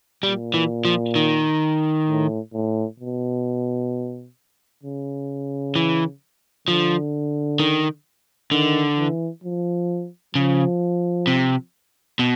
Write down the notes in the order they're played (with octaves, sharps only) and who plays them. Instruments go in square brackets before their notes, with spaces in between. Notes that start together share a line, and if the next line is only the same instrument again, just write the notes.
[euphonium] A#2 [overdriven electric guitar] G3
[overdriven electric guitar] E3
F3
D#3
[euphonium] A2
A2
B2
C#3
[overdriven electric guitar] E3
[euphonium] D3 [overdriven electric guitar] F3
[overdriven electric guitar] D#3
[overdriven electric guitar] D3 [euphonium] D#3
[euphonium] E3
F3
[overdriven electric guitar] C#3 [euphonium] F3
[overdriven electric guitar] C3
B2